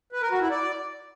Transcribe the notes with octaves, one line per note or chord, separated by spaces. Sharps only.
B4
A#4
F#4
E4
D5